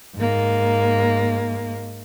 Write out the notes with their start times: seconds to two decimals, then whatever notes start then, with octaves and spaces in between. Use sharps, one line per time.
0.16 G#2 A#3